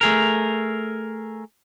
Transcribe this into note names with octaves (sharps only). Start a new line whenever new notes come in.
A3 G#4 A#4